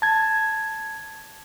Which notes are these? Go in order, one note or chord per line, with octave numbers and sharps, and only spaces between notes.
A5 G#6